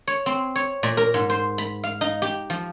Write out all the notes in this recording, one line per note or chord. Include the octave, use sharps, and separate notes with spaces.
C#5
C4
C#5
A#2
A#4
G#2
C5
B5
F5
D#4
G4
F3